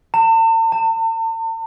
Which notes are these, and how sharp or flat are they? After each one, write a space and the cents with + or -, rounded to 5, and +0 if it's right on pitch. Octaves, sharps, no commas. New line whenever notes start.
A5 +45
A5 +35